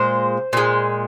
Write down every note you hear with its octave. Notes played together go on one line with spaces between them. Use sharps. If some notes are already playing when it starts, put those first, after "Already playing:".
Already playing: A#2 G#3 C5
A#2 G#3